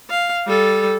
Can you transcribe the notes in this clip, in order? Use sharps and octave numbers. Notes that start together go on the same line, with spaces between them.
F5
G3 A4